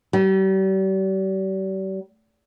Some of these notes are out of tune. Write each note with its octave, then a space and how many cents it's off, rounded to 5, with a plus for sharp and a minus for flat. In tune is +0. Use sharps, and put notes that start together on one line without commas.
G3 -40